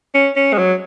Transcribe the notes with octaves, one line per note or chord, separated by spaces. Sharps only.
C#4
C#4
G#3
F#3